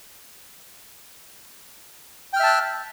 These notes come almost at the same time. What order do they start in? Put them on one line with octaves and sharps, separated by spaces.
G5 F6 E5 A5 F#6